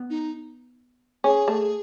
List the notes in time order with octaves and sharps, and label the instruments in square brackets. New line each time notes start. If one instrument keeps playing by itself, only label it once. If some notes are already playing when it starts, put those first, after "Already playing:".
Already playing: [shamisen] B3
[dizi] D#4
[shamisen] C#4 [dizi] G#4
[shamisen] A3